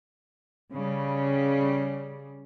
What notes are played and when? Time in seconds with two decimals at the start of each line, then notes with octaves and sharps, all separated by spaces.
0.71 C#3 G3